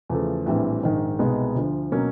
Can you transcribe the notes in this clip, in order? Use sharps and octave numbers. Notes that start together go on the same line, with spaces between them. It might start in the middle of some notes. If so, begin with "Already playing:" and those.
E2 C#3 F3 A3
A#1 A2 E3 G3 C4
A#1 G#2 D#3
C2 B2 G#3 B3 D#4
D2 D3 F3
B2 F#3 A#3 C#4